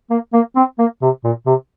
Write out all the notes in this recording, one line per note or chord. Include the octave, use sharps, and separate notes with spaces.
A#3
A#3
C4
A#3
C3
A#2
C3